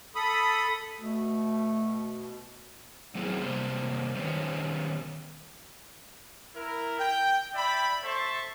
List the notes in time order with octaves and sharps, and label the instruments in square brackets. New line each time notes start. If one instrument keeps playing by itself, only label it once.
[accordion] A4 B5 D#6
[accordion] B2 [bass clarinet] A3
[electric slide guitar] F#3 A3 B3 C4 E4 G#4
C3 G3 A#3 C5
D#3 G3 B3 C#4 C5
[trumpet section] E4 A#4
G5
D5 E5 G5 B5
A4 C5 E5 A5 C6 C#6